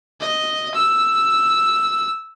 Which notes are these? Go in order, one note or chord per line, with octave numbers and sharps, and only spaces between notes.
D#5
E6